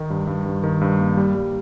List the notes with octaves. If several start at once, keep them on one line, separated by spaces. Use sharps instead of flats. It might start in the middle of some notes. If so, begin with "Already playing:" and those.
Already playing: D#3 D#4
G2
G2
G2
D#3
G2
A#3
G3
G3